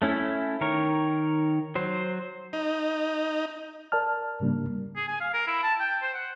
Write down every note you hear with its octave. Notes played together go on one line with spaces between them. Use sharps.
A3 C#4 E4
D#3 A#4 C#5
F#3 C5
D#4
A#4 D5 A5 F6
G#2 C#3 G3 A#3 D4
G#4
G#5
F5
A#4
E4
A5
G5
C5
F#5